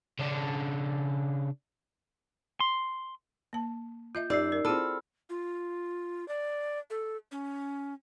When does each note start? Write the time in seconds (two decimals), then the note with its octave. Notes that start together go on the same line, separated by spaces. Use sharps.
0.19 C#3 D4
2.60 C6
3.53 A#3 A5
4.15 F4 D#5 E5 G6
4.30 F#2 D#4 G4 D5 D#5 E6 C7
4.52 A#4
4.65 C4 E4 F4 G#4 A4 B5 E6 F6
5.30 F4
6.28 D5
6.90 A4
7.32 C#4